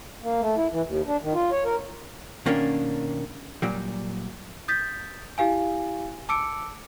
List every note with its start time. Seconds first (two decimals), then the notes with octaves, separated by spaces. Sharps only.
0.23 A#3
0.41 A3
0.57 E4
0.72 E3
0.86 D#2
1.07 D4
1.22 D#3
1.34 F4
1.51 C#5
1.65 A#4
2.46 B2 D#3 A#3 C#4 D4
3.62 A#2 F#3 G3
4.68 D#6 G6 A6 B6
5.38 E4 G4 F5 G#5
6.29 A5 D6 E6 C#7 D7